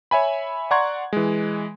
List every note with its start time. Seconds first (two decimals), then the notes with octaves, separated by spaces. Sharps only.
0.11 C#5 E5 G#5 B5
0.71 D5 F#5 A#5 C6 C#6 G#6
1.13 E3 G#3